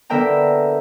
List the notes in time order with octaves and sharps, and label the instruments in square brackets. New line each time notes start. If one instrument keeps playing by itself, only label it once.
[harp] D3 B3 A#4 E5 G5 A#5